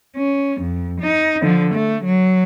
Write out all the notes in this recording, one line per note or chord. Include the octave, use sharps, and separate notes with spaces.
C#4
F2
D#4
D3 F3
A3
F#3